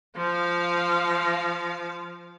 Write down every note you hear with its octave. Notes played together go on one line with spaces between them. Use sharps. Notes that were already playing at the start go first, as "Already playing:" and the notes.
F3 F5